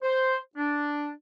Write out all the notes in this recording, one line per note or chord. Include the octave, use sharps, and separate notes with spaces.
C5
D4